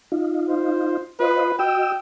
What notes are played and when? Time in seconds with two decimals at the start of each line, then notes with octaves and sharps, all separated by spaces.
0.12 D#4 F4
0.48 C5
1.20 F4 B4 C5 D#5
1.59 F#4 D#5 G5 E6